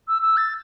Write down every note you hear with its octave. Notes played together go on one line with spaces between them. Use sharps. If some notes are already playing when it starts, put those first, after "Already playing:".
E6
E6
A6